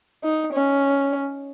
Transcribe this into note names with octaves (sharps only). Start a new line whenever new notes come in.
D#4
C#4